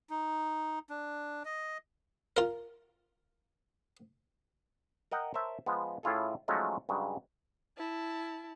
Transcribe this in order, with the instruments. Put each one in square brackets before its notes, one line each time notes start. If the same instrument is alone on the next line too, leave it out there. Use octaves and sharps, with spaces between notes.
[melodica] D#4
D4
D#5
[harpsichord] F4 A#4
[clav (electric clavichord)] A#4 D#5 F#5 G5
A#4 C5 C#5 E5 A5
F3 G#3 B3
A2 C#4 E4 F4 G#4 A4
F3 F#3 G#3 A3 C#4 D#4
G2 C#3 F#3 G#3
[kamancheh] E4 A5